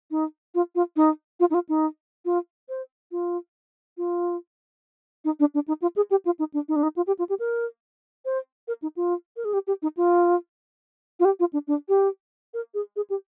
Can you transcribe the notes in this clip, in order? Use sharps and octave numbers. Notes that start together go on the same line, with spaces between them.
D#4
F4
F4
D#4
F4
D#4
F4
D#4
F4
C5
F4
F4
D#4
D4
D4
D#4
F4
G#4
G4
F4
D#4
D4
D#4
D4
D#4
F4
G4
F4
G4
A#4
C5
A#4
D#4
F4
A#4
G#4
G4
G4
D#4
F4
F4
G4
F4
D4
D4
G4
A#4
G#4
G#4
G4